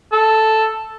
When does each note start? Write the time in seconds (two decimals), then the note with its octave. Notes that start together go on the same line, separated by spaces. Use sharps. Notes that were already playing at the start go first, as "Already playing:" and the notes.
0.13 A4